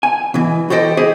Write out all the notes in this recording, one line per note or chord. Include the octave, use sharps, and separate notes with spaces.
G#5
B2 E3
F#4 G4 A4 C5 D#5 G5
G4 G#4 C5 D#5